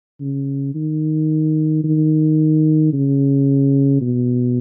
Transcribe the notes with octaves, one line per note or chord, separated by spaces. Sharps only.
C#3
D#3
D#3
C#3
B2